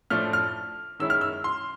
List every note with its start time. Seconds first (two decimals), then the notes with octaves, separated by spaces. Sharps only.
0.10 A2 F3 A3 D4 F6
0.33 F6
0.99 D#3 G#3 C#4 E4 E6
1.10 F6
1.21 E6
1.44 C6